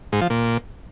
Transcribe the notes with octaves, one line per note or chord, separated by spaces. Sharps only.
G#2
F3
A#2